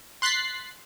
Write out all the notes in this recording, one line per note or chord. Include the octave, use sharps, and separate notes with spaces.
C6 F#6 A6 B6 C7